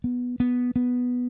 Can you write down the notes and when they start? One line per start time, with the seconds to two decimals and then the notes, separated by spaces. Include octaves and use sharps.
0.04 B3
0.40 B3
0.76 B3